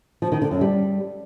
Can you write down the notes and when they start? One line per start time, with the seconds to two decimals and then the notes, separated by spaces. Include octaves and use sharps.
0.22 F3
0.32 D#3
0.42 D3
0.51 F#2
0.61 G3